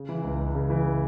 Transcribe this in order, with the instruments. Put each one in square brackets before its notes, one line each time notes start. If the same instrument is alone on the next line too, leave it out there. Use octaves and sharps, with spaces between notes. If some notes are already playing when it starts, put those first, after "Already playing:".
Already playing: [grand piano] C#3
E3
C#2
C#2
C#3
E3